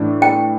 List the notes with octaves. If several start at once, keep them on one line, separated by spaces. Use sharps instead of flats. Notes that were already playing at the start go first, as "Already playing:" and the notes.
Already playing: A2 E3 D4
G5